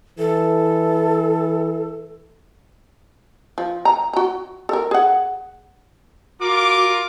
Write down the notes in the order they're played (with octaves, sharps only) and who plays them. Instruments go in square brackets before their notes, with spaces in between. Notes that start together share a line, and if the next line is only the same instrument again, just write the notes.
[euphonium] E3 [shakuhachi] A4
[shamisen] F3
A#5
F#4 A#5
A4 A#4
G#4 F#5
[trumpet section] F4 A#4 D6 [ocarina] F#4